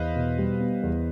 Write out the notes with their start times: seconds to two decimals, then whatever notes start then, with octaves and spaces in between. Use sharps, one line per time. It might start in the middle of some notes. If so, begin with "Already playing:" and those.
Already playing: E2 B4 C5 D#5 F5
0.15 B2
0.39 G3
0.60 B3
0.83 E2